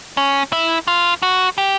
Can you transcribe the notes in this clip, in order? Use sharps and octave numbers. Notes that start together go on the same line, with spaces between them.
C#4
E4
F4
F#4
G4